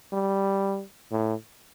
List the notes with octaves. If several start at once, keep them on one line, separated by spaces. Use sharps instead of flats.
G3
A2